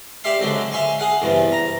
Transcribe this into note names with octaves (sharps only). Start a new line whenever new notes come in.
G4 D5 E5 F5 C6
D3 F#3 G#3 C4
E5 F5 G#5 C6 C#6
G#4 F5 F#5
E2 G2 C3
A#5